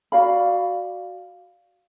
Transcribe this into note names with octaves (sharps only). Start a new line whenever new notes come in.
F#4 D5 F5 B5